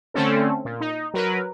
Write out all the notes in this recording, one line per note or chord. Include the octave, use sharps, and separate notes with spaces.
D3 A3 C4 C#4 A4
A#2
D#4
F#3 A#4 B4